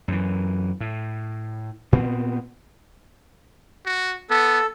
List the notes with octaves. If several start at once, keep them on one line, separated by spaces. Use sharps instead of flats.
F#2 E3
A2
A#2 B3 C4
F#4
B3 A4